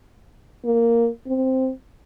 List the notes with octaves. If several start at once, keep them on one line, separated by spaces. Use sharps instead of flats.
A#3
C4